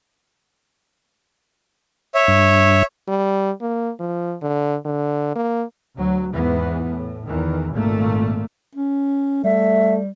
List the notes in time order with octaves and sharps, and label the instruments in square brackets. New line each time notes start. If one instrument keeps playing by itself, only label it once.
[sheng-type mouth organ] C#5 E5
[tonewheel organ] G2
[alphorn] G3
A#3
F3
D3
D3
A#3
[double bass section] D2 F#3
E2 G#2 E3 B3
A2
E2 D#3 E3
G#1 A#2 A3 A#3
[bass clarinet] C#4
[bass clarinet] G3 [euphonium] A3 [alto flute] E5